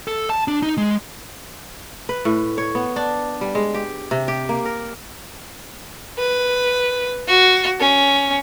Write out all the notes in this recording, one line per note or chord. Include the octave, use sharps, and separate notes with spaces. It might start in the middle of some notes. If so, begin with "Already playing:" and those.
A4
A5
D4
D#4
G#3
B4
A2
C#5
B3
D4
G3
G#3
G4
C3
G4
A#3
A#4
B4
F#4
C#4